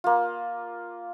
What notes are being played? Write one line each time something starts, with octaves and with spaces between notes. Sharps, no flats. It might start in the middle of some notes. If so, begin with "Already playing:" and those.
A#3 F4